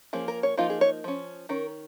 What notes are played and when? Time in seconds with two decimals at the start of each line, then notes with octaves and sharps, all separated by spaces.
0.13 F3 A#3 C#4 G#4
0.28 A#4
0.43 C#5
0.57 F3 A#3 D#4 F4
0.70 G#4
0.81 C#5
1.04 F3 C#4
1.49 D#3 C#4 A#4